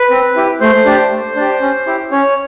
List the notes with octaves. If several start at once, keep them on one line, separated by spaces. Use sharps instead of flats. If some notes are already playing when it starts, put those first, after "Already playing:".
Already playing: B4
C4
E4 G4
A3 C5
D4 G4
A3
D4 G4
C#4
E4 G4
C#4 C#5